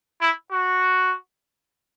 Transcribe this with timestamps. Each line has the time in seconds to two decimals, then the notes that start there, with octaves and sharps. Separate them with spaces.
0.21 E4
0.51 F#4